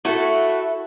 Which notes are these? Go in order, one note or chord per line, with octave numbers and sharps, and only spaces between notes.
A3 E4 F#4 A4